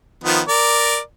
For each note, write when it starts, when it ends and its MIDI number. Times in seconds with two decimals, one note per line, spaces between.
0.24 0.41 51
0.24 0.41 53
0.24 0.41 59
0.48 0.99 70
0.48 0.99 74